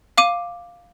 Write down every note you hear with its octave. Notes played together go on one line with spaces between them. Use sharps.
F5 D6 D#7